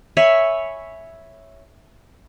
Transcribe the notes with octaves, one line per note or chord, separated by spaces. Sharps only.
C#5 E5 G#5 B5